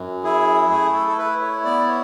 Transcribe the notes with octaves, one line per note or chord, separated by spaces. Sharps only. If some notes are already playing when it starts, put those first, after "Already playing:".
Already playing: F#2
E4 G#4
A3 G#4
A4
A4
E4 B4
C#5
B3 D5
C#5